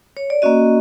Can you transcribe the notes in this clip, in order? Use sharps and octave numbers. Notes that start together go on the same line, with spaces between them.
C#5
D5
A#3 C#4 F#4 D#5